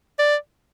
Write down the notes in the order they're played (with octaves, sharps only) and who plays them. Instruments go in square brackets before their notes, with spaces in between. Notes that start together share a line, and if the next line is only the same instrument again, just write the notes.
[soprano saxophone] D5